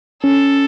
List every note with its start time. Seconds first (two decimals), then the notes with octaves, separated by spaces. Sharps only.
0.24 C#4 A4